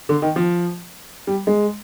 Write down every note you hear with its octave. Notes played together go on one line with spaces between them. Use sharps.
D3
D#3
F3
G3
G#3